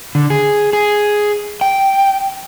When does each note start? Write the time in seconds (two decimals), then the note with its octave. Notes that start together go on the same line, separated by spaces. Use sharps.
0.15 D3
0.30 G#4
0.73 G#4
1.61 G5